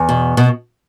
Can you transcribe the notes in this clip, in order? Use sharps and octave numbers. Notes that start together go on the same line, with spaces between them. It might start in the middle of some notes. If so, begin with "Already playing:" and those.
Already playing: E2
B2
B2 B3